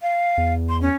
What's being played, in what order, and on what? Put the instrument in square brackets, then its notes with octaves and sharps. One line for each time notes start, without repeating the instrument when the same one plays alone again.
[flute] F5
[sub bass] E2
[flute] C6
C#4